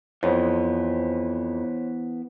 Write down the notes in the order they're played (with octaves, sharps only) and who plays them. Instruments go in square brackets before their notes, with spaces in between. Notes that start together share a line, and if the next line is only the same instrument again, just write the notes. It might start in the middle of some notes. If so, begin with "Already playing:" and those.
[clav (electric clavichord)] F2 [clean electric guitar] E3 B3 [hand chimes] C5 C#5